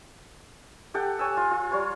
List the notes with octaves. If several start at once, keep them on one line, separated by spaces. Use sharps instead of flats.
G4 A4 F#5 G5
C#5 G#5 E6
F4
F4
G3 C#5 C6 C#6